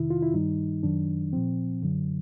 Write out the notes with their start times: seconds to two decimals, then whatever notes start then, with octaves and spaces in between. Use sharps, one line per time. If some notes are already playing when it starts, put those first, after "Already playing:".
Already playing: F2 C3 D#3 E4
0.10 F4
0.22 E4
0.34 G2 D#3 G3 D#4
0.83 F#2 D#3 F#3 D4
1.33 A#2 F3 C4
1.83 F#2 D3 F#3